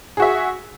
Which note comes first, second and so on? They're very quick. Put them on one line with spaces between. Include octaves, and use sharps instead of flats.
G#4 F#4 E5